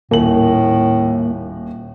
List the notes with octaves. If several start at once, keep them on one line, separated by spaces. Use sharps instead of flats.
D#1 A2 A#3 F#7